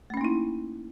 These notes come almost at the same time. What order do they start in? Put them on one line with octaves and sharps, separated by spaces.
A3 C#4 A#3 D#4 E4